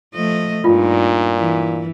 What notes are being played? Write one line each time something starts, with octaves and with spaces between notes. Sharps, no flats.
F3 A3 D#5
G2 A#2 D#4 F4
E3